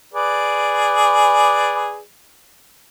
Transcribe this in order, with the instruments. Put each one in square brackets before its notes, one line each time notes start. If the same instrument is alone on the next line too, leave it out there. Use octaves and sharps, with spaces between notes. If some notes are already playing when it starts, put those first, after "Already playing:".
[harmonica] G#4 B4 D5